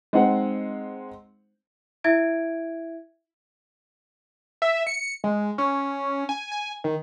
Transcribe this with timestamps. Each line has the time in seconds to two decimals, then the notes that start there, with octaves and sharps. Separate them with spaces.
0.13 G#3 C4 D#4 C5 F#5
2.04 E4 E5 G#6 D7
4.62 E5
4.87 C#7
5.24 G#3
5.58 C#4
6.29 G#5
6.52 G#5
6.84 D#3